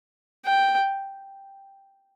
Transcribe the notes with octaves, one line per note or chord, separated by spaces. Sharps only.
G5